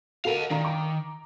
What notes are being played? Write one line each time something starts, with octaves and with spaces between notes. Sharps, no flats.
F#4 A4 A#4 D#5 F5
D#3 D4 F5 A#5
A#5 D6